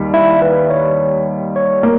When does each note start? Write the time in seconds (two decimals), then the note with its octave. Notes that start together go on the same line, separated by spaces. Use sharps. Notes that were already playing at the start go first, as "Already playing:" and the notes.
Already playing: D#2 D#3 G3
0.14 E4
0.42 B4
0.70 C#5
1.56 C#5
1.83 A#3